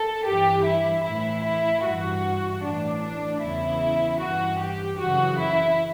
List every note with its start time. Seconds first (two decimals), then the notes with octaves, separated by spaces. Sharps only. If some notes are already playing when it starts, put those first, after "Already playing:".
Already playing: A4
0.25 G2 E3 G4
0.65 E4
1.04 A2 E3 E4
1.44 E4
1.83 G2 E3 F#4
2.62 A2 E3 D4
3.02 D4
3.41 E2 C#3 E3 E4
4.20 G2 E3 F#4
4.60 G4
4.99 F#2 C#3 E3 F#4
5.39 E4